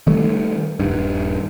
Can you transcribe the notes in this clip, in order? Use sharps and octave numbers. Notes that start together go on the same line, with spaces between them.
D#3 G3 A3
D#1 G2